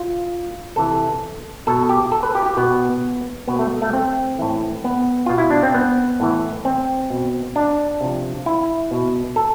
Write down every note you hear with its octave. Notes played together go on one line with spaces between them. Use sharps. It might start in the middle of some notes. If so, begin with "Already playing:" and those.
Already playing: F4
C3 E3 A4
B2 A4
G4
A4
B4
G4
G4
B2 B3
B2 B3
A3
A3
C4
A2 E3
B3
B2 F4
E4
D4
C4
B3
A2 E3
C4
B2
D4
C3 F3
E4
B2
A4